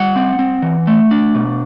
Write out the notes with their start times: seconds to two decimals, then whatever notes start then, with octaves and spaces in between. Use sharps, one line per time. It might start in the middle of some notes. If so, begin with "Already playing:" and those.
Already playing: G3 F#5
0.16 C4
0.39 C4
0.62 E3
0.87 A3
1.11 D4
1.35 B2